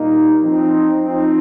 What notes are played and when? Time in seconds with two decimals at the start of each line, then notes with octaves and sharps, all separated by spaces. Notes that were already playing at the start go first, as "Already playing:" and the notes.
Already playing: A#2 G3 A#3 D#4
0.42 F3 C4 D#4
1.03 F3 C4 D#4